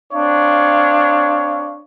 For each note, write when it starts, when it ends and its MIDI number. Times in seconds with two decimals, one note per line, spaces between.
0.12 1.81 60
0.12 1.81 62
0.12 1.81 73
0.12 1.81 77